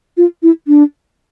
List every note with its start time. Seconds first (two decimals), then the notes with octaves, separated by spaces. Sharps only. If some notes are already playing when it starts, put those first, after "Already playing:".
0.17 F4
0.43 E4
0.68 D4